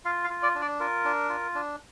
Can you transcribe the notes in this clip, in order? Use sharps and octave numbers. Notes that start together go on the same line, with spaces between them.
F4 F5
F5
F4
D5
D4
D5
F4 A#4
D4
F4
D4